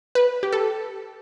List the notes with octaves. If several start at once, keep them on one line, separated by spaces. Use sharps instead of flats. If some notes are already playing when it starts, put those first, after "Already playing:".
B4
G4
A4